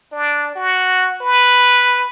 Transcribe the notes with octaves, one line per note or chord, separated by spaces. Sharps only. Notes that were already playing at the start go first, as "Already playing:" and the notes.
D4
F#4
B4